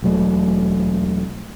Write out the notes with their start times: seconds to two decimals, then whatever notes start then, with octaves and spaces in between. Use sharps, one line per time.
0.02 E1 F#3 A3